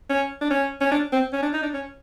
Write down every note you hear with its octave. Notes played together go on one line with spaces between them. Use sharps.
C#4
D4
C#4
C#4
D4
C4
C#4
D4
D#4
D4
C#4